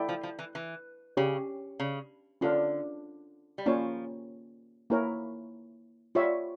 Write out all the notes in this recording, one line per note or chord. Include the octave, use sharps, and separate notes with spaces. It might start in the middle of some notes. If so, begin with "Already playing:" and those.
Already playing: E4 A4 D5 G5
F3
F3
E3
E3
C#3 C#4 G4 C#5
C#3
D3 C#4 F4 A4 D5 F5
G3
F3 A#3 C#4 F4 C#5
A#3 E4 A#4 C#5
G3 F4 C#5 E5